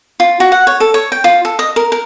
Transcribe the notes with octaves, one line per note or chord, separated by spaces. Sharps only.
F4
F#4
F#5
C#5
A4
C#5
G5
F4
A4
D#5
A#4
A#4